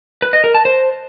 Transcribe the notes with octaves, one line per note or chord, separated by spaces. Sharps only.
B4
D#5
A#4
A5
C5